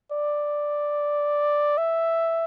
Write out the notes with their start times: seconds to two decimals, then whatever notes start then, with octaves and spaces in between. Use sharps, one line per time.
0.12 D5
1.77 E5